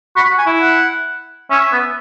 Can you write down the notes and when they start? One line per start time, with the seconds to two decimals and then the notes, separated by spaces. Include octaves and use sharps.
0.16 F#4 B5
0.31 F#4
0.38 G#5
0.46 E4
0.61 F#5
1.51 C#4 E5
1.73 B3